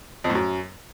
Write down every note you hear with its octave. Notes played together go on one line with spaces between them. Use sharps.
F2
A2
F#2